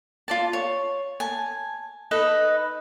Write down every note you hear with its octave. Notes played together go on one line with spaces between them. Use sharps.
F4 D5 A5
C#5
G#5 A5
D#4 A4 B4 D#5